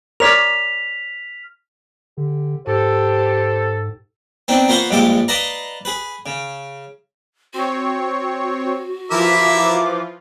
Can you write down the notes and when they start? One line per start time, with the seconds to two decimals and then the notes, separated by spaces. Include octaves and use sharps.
0.20 A#4 C#5 D5 F6 B6 F7
2.17 D3 G4
2.67 G#2 G4 A4 C5
4.48 B3 C4 D4 D#4
4.68 A#3 B3 F4 C5 F#5 C#6
4.91 A#1 G2 G#3 G4 A4 D6
5.28 B4 D5 D#5 F5 A5 A#5
5.85 G#4 B4
6.26 C#3
7.54 C4 F#4 C#5
9.11 E3 F3 E4 F4 A#4 E5 D6